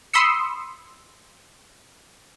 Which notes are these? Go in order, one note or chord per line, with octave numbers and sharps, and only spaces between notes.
B5 C6 D#6 E6 C#7